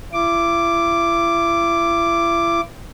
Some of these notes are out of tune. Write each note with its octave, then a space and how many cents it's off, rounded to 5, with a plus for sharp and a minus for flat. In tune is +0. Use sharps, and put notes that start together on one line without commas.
E4 +40 D6 +0